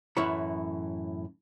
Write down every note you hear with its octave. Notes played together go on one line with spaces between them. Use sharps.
F#2 A2 E3 E4 C#5 B5